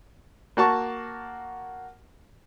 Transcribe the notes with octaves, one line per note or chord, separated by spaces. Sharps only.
A#3 F#4 A5 C#6